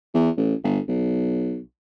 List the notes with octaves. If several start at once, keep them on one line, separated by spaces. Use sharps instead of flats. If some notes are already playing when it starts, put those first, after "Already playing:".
E2
A1
G1
B1